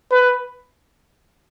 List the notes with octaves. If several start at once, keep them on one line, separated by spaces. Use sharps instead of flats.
B4